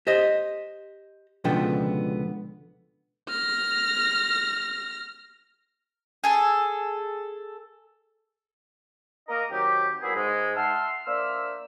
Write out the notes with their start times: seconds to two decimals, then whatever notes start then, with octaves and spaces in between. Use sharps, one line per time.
0.07 G4 C5 D#5
1.44 C#2 B2 D3 F3 B3 G5
3.29 F6 A#6
6.24 G#4 A4
9.29 A#3 A#4 D#5
9.51 D#3 F#3 C4 G4
10.02 F#3 A#3 B3 E4 G#4
10.16 G#2 G#3
10.56 E5 F#5 A5 C6 E6 F6
11.06 A#3 D4 C5 E5 E6 F6